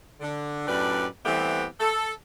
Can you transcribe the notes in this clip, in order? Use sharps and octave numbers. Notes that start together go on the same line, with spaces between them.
D3
F#2 A2 D4 G4 B4 D5
E3 G3 A3 B3 C4 G4
A4